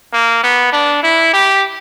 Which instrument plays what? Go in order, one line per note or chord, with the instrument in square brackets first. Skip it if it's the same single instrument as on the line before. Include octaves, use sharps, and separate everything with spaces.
[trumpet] A#3
B3
D4
E4
G4